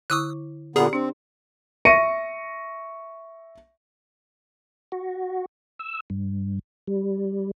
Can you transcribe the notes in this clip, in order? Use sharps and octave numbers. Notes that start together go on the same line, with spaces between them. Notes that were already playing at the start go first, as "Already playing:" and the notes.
D3 E4 C#6 D#6 E6 F#6
A#2 D3 B3 G4 G#4 D5 A#5
C4 D4
E5 C#6 A#6 C#7 D#7
F#4
E6
G2
G3